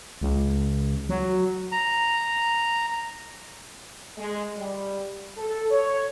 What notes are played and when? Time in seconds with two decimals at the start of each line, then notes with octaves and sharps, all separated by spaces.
0.21 C#2
1.09 F#3
1.72 A#5
4.18 G#3
4.57 G3
5.37 A4
5.71 C#5